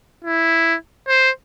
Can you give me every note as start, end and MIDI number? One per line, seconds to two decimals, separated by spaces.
0.24 0.75 64
1.08 1.30 72